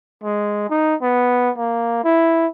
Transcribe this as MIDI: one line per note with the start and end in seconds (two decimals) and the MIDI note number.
0.24 0.67 56
0.70 0.95 63
1.02 1.51 59
1.57 2.01 58
2.04 2.47 64